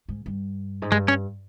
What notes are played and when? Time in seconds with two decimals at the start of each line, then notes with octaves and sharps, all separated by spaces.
0.09 G#2
0.26 G2
0.82 G#2
0.91 G2 G#3
1.08 C#4